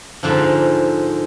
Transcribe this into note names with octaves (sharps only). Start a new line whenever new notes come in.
G#2 D3 F3